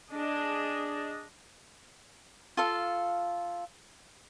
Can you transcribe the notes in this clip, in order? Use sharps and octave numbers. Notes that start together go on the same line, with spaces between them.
D4 G#4 D#5
F4 A4 F5